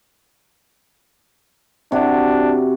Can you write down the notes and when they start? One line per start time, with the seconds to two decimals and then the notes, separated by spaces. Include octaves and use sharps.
1.92 C3 D4 F#4